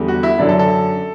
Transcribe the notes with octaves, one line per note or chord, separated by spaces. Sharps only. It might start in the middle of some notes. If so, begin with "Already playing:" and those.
Already playing: E2 D3 G3
F#4
E4
F#2 D3 F#3 D4
A4
A4